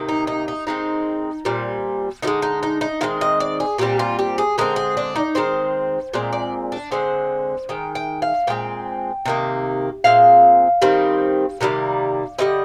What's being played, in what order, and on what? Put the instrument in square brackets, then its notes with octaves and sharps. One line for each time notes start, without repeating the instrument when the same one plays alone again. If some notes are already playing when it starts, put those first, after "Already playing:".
Already playing: [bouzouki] C3 D#3 A#3
D#4
D#4
D#4
D#3 G#3 C4 D#4
A#2 G3 C4
D3 F3 D#4
G#3
D#4
D#4
D#4
D#3 G#3 C4 F4
D#5
D5
G#4
A#2 G3 C4 G4
F4
G4
G#4
D3 G#3 C4 A#4
G#4
D4
D#4
D#3 G#3 C4 C5
A#2 G#3 C4 D5
D5
D4
D3 G#3 C4 C5
D#3 G#3 G5
G5
F5
A#2 G#3 C4 G5
C3 D#3 A#3
A#2 G#3 C4 F5
D#3 G3 C4
C3 D#3 G3 A#3
D3 G3 C4 D#5